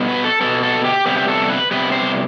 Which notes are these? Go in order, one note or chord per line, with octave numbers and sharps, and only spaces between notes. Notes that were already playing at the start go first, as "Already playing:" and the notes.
Already playing: B2 G3 B3
B4
A4
B2 G3 B3 A4
A4
G4
C3 G3 B3 G4
G4
A4
B4
C3 G3 B3 B4
C5